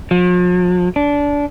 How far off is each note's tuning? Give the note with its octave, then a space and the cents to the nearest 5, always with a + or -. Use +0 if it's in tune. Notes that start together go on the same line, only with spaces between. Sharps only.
F3 +45
D4 -20